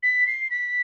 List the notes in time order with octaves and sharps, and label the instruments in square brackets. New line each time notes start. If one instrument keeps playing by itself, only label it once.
[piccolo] B6
C7
B6